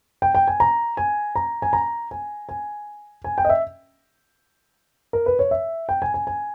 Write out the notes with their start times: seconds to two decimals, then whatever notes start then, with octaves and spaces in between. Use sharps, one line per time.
0.22 G5
0.35 G5
0.47 G#5
0.60 A#5
0.97 G#5
1.36 A#5
1.62 G#5
1.73 A#5
2.11 G#5
2.49 G#5
3.24 G#5
3.38 G5
3.45 D#5
3.49 E5
5.13 A#4
5.26 B4
5.39 C#5
5.51 E5
5.89 G5
6.02 G#5
6.14 G#5
6.27 G#5